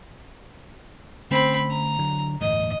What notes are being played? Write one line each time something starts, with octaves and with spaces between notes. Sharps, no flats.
D3 A3 C4 C#4 B5
A#5
D3 F#3
G1 E2 A2 D#5